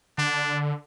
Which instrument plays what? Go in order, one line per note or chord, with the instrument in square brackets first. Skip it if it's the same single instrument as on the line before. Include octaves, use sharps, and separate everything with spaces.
[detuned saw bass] D3 [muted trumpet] D4